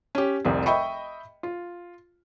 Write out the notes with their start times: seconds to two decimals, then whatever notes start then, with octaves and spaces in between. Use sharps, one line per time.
0.15 C#4 G4
0.45 F1 C2 C4
0.66 D#5 E5 G5 B5 C#6
1.43 F4